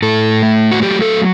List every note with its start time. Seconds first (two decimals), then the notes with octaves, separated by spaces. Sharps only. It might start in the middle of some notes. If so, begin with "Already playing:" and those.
0.02 A2 A4
0.43 A3
0.72 F#4
0.82 F#3 G4
1.02 A4